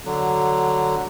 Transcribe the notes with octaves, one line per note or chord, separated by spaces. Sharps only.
D3 F#3